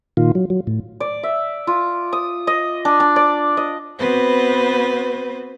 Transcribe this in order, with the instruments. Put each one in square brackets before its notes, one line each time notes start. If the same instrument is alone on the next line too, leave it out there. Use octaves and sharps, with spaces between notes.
[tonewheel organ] A#2 D#3 F4
F#3
F#3
A2
[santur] D5
E5
F4
D#6
D#5
D4
D4
D5
D#5
[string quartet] B3 C4 F#4 B4 C5